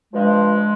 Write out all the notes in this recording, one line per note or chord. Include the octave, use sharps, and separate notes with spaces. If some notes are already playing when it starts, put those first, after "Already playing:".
G2 F3 G#3